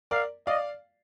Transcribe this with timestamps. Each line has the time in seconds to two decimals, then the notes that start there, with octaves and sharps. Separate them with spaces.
0.11 A#4 D5 F5
0.47 D5 D#5 F5